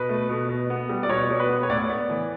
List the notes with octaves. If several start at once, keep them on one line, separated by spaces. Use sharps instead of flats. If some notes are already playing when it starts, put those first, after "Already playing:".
Already playing: B2 B4
A3
B2
B2
B3
G3
D5
B2 C#5
B2
B4
B3
C#5
A2 D5
B3
E3